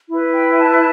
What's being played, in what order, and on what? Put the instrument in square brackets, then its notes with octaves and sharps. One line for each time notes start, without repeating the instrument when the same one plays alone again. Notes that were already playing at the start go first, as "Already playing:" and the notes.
[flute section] E4 B4
G5
A5